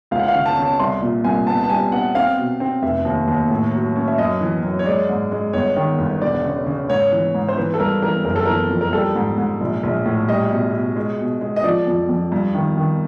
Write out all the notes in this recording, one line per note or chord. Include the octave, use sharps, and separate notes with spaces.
C#2 F5
F#5
F5
C#3
A5
C#3
A5
C2 C6
A#2
C2 G#5
B3 A5
A5
G3 G#5
B3 F#5
C4 F5
B2
C4
F1 E5
D#2
D#2
A2
F#3
C#4
E5
F#2 D#5
E3
F#2
C#5
G#3 D5
G#2
G#3
G1 C#5
D#3
G1
E1 D5
C#3
C#3
G#2 C#5
E3
G#2
C5
E3 B4
A4
G2 A#4
E3 A#4
F#1 A#4
A4
E3 A#4
F2
A#4
G3 A4
G#2
G#2
A#1
A#1
A2
G3 D#5
B2
B2
G#3
B2
G#3
D#5
F3 D5
F2
F2
G2
D#3
D#3